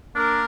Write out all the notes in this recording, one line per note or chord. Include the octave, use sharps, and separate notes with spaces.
A#3 D4 A#4